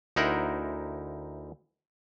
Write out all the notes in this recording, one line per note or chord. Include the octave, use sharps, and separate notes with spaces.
D2 D#4 E4 A#4 C5 F#5